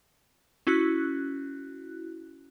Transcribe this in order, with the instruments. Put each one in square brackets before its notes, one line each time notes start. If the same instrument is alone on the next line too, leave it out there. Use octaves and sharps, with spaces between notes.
[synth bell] C#4 E4 F#4 F#6